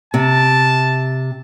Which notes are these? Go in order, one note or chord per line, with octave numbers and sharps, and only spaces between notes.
C3 A5